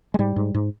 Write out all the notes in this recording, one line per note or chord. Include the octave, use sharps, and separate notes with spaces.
G#3
G#2 G3
G#2
G#2